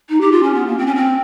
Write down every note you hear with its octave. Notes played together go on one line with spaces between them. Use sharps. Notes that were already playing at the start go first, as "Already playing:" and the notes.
D#4
G4
F4
C#4
B3
A#3
C4
C#4
C4